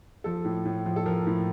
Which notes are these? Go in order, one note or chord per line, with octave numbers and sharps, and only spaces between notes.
F3 A4
A2
A2
F3
A4
F3 A#4
A2